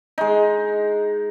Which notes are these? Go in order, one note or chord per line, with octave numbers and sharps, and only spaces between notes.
G#3 D#4